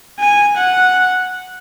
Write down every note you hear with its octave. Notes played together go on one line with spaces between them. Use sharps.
G#5
F#5